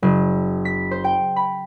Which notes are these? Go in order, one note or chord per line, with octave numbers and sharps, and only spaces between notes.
F#1
B6
C5
G5
B5